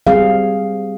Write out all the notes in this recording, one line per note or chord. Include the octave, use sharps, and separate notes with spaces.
G3 C4 G#4 F5